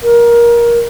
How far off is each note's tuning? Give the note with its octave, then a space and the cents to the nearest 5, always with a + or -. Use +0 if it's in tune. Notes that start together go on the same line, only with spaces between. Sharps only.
A#4 +20